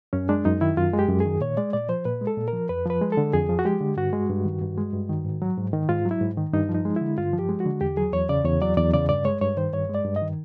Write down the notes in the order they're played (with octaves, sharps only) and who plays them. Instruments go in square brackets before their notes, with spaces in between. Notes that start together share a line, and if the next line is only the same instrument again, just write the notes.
[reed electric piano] F#2 C#4
G#3 D4
F#2 D#4
D#3 E4
F#2 F4
G#3
G4
F#2
G#4
D#3
A#2 C#5
G#3 D5
A#2 D5
F3 C5
A#2 B4
G#3
A4
A#2
A#4
F3
F2 B4
F3 B4
G#3
A4
D3
F2 G#4
F3
F#4
G#3 G4
D3
G2 F#4
G#3
G2
D#3
G2
G#3
G2
D#3
G#2
F#3
G#2
D#3
G#2 F4
F#3
E4
G#2
D#3
G2 D#4
F3
D#4
G#3
D3 E4
G2 F4
F3
G4
G#3
F#4
D3
E2 G4
F#3 G#4
E2 C#5
C#3 D5
E2 C#5
F#3 D5
E2 D5
C#3 D5
G2 D5
G#3 C#5
G2 C#5
D#3 C5
G2 C#5
G#3
D5
G2
D#5
D#3